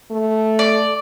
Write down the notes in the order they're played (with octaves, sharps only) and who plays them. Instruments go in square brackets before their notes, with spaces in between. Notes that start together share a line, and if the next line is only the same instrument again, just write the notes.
[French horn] A3
[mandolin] D5